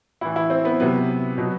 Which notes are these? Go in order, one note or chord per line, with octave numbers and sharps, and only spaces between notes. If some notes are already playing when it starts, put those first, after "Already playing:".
A2 E3 E4
E4
C4
B3
C3 F#3 B3
B2 F#3